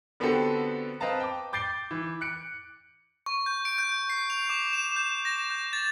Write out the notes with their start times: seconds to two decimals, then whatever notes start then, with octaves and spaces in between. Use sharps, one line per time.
0.20 D3 B3 C4 F#4 G4 A4
1.00 C4 B4 D#5 F5 A5 A#5
1.20 G5 D6
1.53 D6 G6 A6 C7 D7 G7
1.91 E3
2.21 F#6 C#7 D7
3.26 C#6
3.46 G6
3.65 D7
3.78 G6
4.10 C7
4.30 F7
4.49 D6
4.73 E7
4.96 G6
5.25 A#6
5.50 G6
5.73 A6